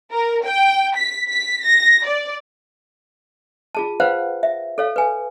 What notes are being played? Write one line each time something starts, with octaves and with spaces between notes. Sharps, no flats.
A#4
G5
B6
B6
A#6
D5
F4 G#4 A5
F4 B4 C5 F5 F#5
E5
A4 C#5 F5
B4 G#5